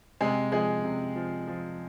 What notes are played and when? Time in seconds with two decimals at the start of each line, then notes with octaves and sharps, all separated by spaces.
0.21 C3 G#3 G#4
0.52 F3 G#3 G#4
0.84 C3
1.16 F3
1.48 F3